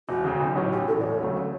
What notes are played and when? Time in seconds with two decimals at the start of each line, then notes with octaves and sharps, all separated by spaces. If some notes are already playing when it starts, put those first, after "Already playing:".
0.09 E1 F#4
0.24 D2 C#3
0.40 B1
0.56 A2 F#3 C#4
0.72 B1 G4
0.88 A2 A4
0.93 E3
1.00 D5
1.03 E1 C#5
1.21 D2 C#3 F#3 A3